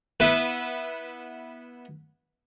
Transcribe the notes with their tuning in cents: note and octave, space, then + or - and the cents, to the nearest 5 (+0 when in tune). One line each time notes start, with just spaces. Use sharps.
B3 -15 E4 -10 B4 +5